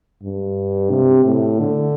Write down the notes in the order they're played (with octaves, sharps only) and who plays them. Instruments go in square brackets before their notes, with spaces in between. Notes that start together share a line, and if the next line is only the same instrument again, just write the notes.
[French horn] G2
C3
A2
D3